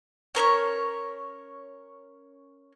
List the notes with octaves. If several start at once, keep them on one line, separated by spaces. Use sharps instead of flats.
C#4 A#4 C5 C#5